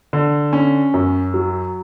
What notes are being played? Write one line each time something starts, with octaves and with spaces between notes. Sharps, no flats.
D3
C#4
F#2
F#3